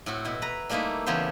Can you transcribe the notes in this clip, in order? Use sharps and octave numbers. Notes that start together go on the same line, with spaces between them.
A2 C4 F#4
B2 E4
B4 A#5
G3 A3 A#3 D#4 E4 B4
E2 C#3 B3 G4 C5